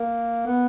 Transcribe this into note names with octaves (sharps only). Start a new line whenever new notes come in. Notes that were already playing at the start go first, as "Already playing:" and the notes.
Already playing: A#3
B3